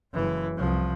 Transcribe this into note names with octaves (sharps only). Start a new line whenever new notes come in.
F#1 E3
C2 F3